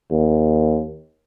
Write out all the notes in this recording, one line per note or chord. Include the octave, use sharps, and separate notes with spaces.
D#2